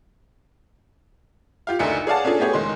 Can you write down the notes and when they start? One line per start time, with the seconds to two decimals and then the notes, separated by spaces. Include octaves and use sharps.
1.67 F4 G4 F5
1.79 F#1 D2 D4 D#4 E5 C#7
2.07 G#4 C#5 D5 F5 F#5 A5
2.25 C#4 D4 F4 G#4 A4
2.39 A3 B3 G4 G#4 C#5
2.53 F#1 D#3 G#3 C6